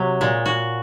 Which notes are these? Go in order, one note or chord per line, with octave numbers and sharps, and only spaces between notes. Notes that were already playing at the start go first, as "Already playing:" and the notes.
Already playing: C3 F#3
A#2 G#3
F#4